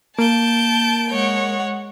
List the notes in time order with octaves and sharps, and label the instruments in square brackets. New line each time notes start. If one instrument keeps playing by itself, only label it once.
[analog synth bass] A#3 [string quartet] A5 [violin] G6 D7
[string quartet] G#3 C#5 F#5